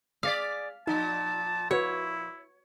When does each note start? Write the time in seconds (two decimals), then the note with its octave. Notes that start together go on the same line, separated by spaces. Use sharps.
0.23 G#4 C#5 D5 F5 D6 A6 B6
0.87 A#2 F3 D#4 A5
1.71 E4 F#4 B4 C#5